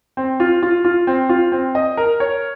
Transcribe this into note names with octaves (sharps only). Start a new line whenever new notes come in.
C4
F4
F4
F4
C4
F4
C4
D#5
A#4
C#5